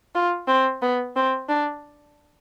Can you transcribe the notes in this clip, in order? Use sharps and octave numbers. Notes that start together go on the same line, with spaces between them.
F4
C4
B3
C4
D4